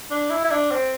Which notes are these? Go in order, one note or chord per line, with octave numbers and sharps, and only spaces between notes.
D4
E4
E4
D4
C4